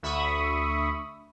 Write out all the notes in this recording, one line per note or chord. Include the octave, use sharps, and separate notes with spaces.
D2 E5 B5 C#6 D#6